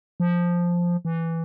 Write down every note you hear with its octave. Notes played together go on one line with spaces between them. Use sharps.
F3
E3